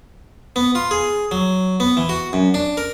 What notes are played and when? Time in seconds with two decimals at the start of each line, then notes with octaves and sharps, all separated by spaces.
0.56 B3
0.75 F4
0.91 G#4
1.31 F#3
1.80 B3
1.97 E3
2.09 F#4
2.33 F#2
2.54 D4
2.77 A#4